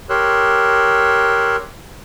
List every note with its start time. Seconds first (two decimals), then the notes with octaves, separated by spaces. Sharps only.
0.10 G4 A#4 C#5 C6 E6 F#6